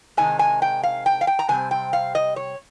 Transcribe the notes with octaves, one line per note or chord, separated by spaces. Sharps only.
C3 D#3 G#3 D#4 G#5
G#5
G5
F5
G5
F5
G5
A#5
C3 G3 C4 G#5
G5
F5
D#5
C#5